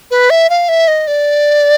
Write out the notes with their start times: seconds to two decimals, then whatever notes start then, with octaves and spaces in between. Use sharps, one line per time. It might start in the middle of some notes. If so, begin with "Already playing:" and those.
0.11 B4
0.30 E5
0.50 F5
0.69 E5
0.88 D#5
1.07 D5